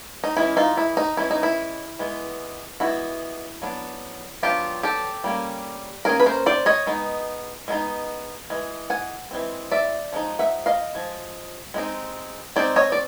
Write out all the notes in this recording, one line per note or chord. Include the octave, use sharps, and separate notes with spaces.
D#4
E3 G#3 C#4 E4
D#4 F4
E4
D#4
E3 G#3 C#4 E4
D#4
E4
E3 G#3 B3
E3 G#3 B3 E4 F#4
F#3 B3 D4
F#3 B3 D4 F4 G4
G4 A4
G3 A#3 C#4
G3 A#3 C#4 G#4 A#4
B4
A#4 C5
C5 D5
C#5 D#5
G#3 B3 D#4
G#3 B3 D#4
E3 G#3
F#5 G#5
E3 G#3 C4
D5 E5
F3 G#3 D#4
E5 F#5
D#5 F5
F3 G#3
G#3 C4 D#4
G#3 C4 D#4 C5 D5
C#5 D#5
D5